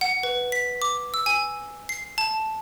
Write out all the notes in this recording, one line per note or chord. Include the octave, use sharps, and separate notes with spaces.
F#5
B4
B6
D6
E6
G#5
C7
A5